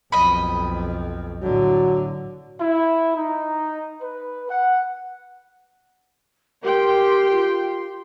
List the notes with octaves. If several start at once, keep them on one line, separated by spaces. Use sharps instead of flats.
B1 F2 D#5 B5
A2 D3 F#3
E4
D#4
B4
F#5
G4 A#4 G5 C6
F4